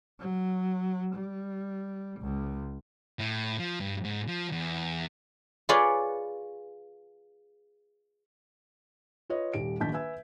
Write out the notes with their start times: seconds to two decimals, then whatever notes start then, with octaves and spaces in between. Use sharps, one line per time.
0.20 F#3
1.14 G3
2.21 C#2
3.19 A2
3.59 F3
3.80 G2
4.05 G#2
4.28 F3
4.52 E2
5.69 F4 G#4 B4 C#5 D5
9.30 F4 B4 C#5 D#5
9.53 D#1 G3 D7
9.80 A#1 D#3 A#3 A5 G6 B6
9.93 B4 E5 G#5 E6 G#6